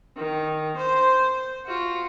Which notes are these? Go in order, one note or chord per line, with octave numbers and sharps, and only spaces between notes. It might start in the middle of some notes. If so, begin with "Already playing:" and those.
D#3
C5
F4 F#4